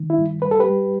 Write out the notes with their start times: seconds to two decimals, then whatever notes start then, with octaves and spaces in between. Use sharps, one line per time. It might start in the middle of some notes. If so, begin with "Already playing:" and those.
Already playing: D#3
0.10 E4
0.18 G2
0.42 G2 B4
0.51 A4
0.59 G4 B4
0.66 G3